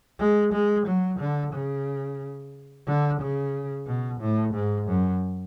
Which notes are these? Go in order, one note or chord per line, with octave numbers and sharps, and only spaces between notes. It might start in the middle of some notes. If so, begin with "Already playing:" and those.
G#3
G#3
F#3
D3
C#3
D3
C#3
B2
A2
G#2
F#2